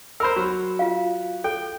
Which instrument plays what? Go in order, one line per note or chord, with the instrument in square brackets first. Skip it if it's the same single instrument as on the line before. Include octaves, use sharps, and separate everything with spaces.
[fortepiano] A#4 C5 [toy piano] B5 E6
[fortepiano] F#3
[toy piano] F4 F5
[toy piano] A4 [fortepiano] G5